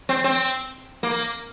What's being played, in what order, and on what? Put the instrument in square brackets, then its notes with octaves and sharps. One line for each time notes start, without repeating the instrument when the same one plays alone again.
[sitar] C4
C4
A#3